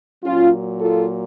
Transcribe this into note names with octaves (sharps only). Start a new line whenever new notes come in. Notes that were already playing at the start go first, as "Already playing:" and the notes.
A#2 F#3 C#4 F4
F4 A4